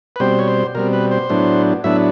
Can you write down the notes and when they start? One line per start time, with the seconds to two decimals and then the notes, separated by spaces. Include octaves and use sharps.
0.16 B4
0.20 B2 G3 C4 C5
0.39 C#5
0.48 C5
0.75 B2 G3 C4 A#4
0.93 B4
1.11 C5
1.29 A2 F#3 B3 D4
1.84 A2 F#3 B3 D4 E5